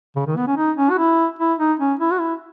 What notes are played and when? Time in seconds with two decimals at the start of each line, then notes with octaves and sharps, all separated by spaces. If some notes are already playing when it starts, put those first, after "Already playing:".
0.16 C#3
0.27 D#3
0.37 B3
0.47 C#4
0.57 D#4
0.77 C#4
0.90 F#4
0.98 E4
1.39 E4
1.59 D#4
1.79 C#4
2.00 E4
2.13 F#4
2.20 E4